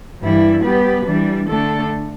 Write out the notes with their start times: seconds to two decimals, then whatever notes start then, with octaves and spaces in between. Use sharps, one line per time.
0.21 G2 E3 G3 E4
0.62 G3 B3 G4 B4
1.05 E3 G3 D4
1.47 D3 A3 D4 A4